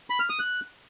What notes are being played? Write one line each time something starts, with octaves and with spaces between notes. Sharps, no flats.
B5
F6
D#6
F#6